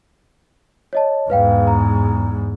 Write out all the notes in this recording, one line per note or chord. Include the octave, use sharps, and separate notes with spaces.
C#5 D#5 A5
E2 G#2 B4 F5 G5
A#5